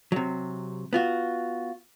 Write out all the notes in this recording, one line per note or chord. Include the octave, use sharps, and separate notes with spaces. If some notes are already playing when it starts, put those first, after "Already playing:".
C3 F#3
B3 F4 F#4